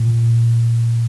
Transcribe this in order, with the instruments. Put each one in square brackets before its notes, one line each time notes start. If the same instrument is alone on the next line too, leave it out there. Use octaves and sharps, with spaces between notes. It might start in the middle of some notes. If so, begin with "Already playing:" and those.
Already playing: [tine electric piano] A#2